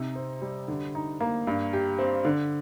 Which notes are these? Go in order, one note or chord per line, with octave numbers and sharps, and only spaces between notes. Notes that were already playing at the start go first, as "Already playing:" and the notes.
Already playing: C3 D#4
C4
G3
D3
D#4
A#3
G2
G4
C4
D3